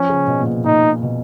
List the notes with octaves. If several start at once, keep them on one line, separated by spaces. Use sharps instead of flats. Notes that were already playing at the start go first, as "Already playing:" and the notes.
Already playing: F3 C#4
C#3
B2
A#2
B2
A#2 D#4
B2